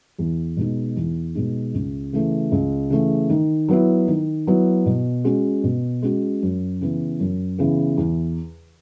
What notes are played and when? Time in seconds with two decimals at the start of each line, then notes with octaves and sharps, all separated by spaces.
0.18 E2
0.57 B2 G#3 D#4
0.96 E2
1.35 B2 G#3 D#4
1.74 C#2
2.13 C#3 E3 A3
2.52 C#2
2.90 C#3 E3 A3
3.30 D#3
3.68 F#3 B3 E4
4.08 D#3
4.47 F#3 B3 E4
4.86 B2
5.24 G#3 C#4 F#4
5.64 B2
6.02 G#3 C#4 F#4
6.42 F#2
6.81 C#3 E3 B3
7.20 F#2
7.58 C#3 E3 B3
7.97 E2